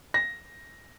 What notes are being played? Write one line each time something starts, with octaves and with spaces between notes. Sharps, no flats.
A#6